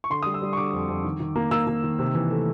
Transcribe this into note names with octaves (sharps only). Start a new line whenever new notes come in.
C#6
D3 C6
G3 D#6
E6
G3
C#6
D3 D6
F2
F2
D#3
D#3
A#3
A#3 E6
A#3
D#3
C3
E3
A3